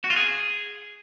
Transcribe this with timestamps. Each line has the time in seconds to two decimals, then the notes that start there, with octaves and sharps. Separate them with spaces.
0.04 F#4
0.10 F4
0.16 G#4